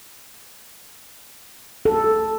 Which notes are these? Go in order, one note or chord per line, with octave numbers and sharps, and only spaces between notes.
A4